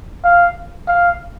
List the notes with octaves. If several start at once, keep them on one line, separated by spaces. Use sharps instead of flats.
F5
F5